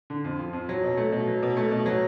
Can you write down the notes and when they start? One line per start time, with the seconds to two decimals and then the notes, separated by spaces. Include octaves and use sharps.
0.10 D3
0.24 F2
0.39 F3
0.53 F2
0.69 F#3
0.83 B2
0.97 A3
1.12 B2
1.27 F#3
1.43 B2
1.57 A3
1.71 B2
1.86 F#3